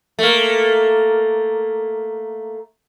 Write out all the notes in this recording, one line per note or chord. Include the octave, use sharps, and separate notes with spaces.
A3 A#3